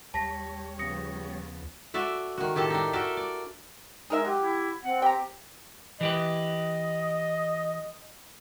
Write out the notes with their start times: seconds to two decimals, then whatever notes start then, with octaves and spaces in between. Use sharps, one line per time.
0.14 D#2 G3 C#5 A5 A#6 B6
0.79 C#3 F3 B3 D#6 A#6 C#7
1.94 A3 F#4 D5 E5
2.38 D#3 F#4
2.55 A2 D#3 G4 A4 A5
2.70 D4 D#4
2.93 F#4 A4 A#4 D5 E5
3.17 D5
4.10 G#3 D#4 G#4 A#4 E5
4.25 F#3 G4
4.40 E4
4.83 C4 F#5
5.02 G4 G5 A#5
6.01 E3 G4 B4 D#5